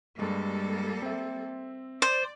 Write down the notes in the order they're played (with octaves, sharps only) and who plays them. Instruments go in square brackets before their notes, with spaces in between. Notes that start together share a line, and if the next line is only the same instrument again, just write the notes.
[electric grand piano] G2 G#3 [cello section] G3 A#3 A4
[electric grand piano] C4 E5
[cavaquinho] C5 [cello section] D5